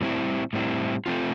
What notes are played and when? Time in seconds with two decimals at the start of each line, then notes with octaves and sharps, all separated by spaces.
0.01 A2 G3 C4 E4
0.53 A2 G3 C4 E4
1.06 A3 C4 F4